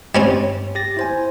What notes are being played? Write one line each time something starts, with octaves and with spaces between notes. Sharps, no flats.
G2 G3 C4 C#4 C#5
G4 A6 A#6
E4 C5 G#5